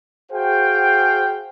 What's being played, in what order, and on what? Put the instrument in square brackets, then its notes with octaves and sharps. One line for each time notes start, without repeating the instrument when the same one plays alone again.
[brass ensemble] F#4 G#4 C5 F5 G5